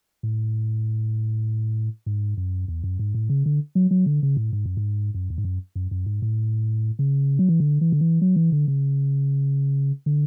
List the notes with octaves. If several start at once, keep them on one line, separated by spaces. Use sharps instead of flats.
A2
G#2
F#2
E2
F#2
G#2
A2
C#3
D3
F#3
F#3
D3
C#3
A2
G#2
F#2
G#2
F#2
E2
G#2
F#2
F#2
F#2
G#2
A2
C#3
F#3
E3
D3
E3
D3
E3
F#3
E3
D3
C#3
D3